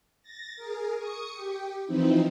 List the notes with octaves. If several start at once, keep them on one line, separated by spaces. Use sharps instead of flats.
A6 A#6
G#4 A#4
C#6 D#6 C#7
G4
E3 F3 C4 D#4 E4